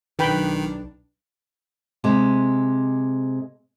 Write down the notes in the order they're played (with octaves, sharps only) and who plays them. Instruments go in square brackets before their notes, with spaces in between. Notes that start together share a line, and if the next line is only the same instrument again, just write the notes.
[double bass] B1 D4 [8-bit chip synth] D#3 [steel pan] B4 G5 B5
[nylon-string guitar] C3 G#3